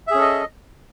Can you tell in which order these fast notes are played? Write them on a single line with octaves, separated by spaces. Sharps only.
E5 G#4 C#4 A4 D#5